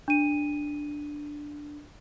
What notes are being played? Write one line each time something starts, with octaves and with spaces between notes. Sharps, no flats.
D4 D#7